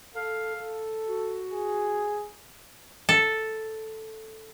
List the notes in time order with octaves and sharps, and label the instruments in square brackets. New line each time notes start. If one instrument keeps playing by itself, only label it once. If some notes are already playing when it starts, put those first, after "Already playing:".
[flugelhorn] A4 [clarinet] F5
[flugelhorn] A4
[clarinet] F#4
[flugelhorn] G#4
[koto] A4